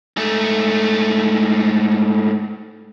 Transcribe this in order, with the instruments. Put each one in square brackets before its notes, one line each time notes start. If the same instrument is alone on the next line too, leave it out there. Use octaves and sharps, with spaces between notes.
[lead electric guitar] G#2 A3